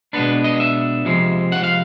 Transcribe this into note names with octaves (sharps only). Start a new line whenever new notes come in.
B2 G#3 B3 D4 B4
D#5
E5
F2 C3 F3 G#3
F#5
F5